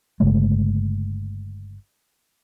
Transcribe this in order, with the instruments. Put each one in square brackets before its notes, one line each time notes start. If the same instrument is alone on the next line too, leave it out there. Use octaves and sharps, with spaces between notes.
[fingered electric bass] G1 C#3 G#3 A3